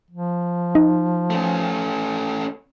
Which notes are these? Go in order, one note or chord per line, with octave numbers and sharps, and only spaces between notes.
F3
D#4
A3 C#4